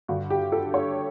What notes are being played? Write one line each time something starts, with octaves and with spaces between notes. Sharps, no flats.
G2 D3 F#4
G4
A4
C#5